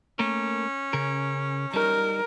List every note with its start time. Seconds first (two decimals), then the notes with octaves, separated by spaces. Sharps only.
0.19 A3 A#3 C#4 A#4
0.93 C#3 G#4 A#4
1.74 G3 D#4 A#4